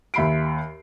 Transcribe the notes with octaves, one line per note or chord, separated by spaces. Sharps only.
D#2 E5 B5 C7 D7